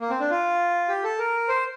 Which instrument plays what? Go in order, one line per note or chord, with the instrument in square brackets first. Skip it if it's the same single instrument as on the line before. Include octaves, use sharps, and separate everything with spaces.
[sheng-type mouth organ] A#3
C4
D4
F4
G4
A4
A#4
C5